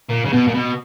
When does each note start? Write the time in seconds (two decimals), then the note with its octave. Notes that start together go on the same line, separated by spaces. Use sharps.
0.10 A#2
0.25 C#3
0.33 B2
0.47 A#2
0.54 B2